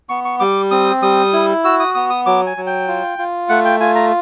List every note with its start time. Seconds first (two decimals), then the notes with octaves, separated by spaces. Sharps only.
0.09 B3 C#6
0.25 C#6
0.40 G3 D6
0.71 C4 D#6
1.02 G3 D#6
1.33 E4
1.65 F#4 E6
1.80 D#6
1.95 B3 D#6
2.10 D#6
2.26 F#3 D6
2.46 G#5
2.57 F#3
2.66 G5
2.88 F4
3.19 F4
3.49 A3 F#5
3.65 G5
3.80 F4 G#5
3.95 A#5